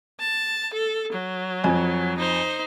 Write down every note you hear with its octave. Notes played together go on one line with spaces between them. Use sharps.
A5
A4
F#3
F2 G#5
D#4 C5